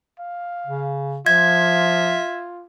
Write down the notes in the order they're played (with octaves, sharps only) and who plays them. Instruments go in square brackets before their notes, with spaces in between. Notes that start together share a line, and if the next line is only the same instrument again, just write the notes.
[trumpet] F5
[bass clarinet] C#3
[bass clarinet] F3 [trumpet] F4 [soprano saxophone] E5 [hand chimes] G#6